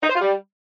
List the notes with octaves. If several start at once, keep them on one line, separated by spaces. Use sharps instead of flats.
D#4
C5
F4
G3